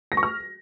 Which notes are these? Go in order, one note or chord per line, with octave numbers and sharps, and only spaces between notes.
A#6
C#6
F6